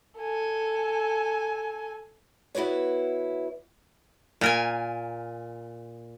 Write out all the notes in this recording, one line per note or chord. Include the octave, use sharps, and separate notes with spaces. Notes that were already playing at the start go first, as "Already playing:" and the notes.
A4 G#5
B3 E4 F#4 B4 C#5
A#2 A#4 G#5